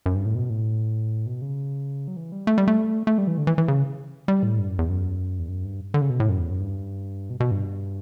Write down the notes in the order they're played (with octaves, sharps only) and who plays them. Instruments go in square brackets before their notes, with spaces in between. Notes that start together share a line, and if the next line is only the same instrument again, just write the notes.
[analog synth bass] F#2
G2
A2
B2
A2
B2
C#3
F#3
E3
G3
A3
G3
A3
A3
G3
E3
D3
E3
E3
C#3
G3
A2
G2
F#2
E2
F#2
E2
F#2
G2
D3
C#3
B2
A2
F#2
E2
F#2
G2
B2
B2
G2